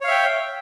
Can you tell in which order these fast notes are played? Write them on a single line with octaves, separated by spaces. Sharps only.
C#5 F5 E5 G5